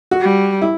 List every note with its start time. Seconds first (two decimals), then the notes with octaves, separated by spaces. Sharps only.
0.11 F#4
0.21 G3
0.62 E4